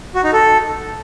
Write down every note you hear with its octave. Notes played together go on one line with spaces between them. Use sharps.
F#4
D#4
A4